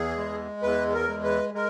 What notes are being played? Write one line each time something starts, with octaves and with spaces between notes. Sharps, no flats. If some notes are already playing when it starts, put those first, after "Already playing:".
Already playing: E2 G#4
G#3
E2 B4
A#4
G#3
B4
G#3 A#4